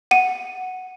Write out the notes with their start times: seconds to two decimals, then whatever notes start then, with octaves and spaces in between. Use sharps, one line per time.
0.11 F#5 D#7